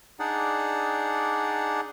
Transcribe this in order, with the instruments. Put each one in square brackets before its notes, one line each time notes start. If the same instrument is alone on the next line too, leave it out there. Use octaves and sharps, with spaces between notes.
[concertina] D4 D#4 G#4 D5 F#5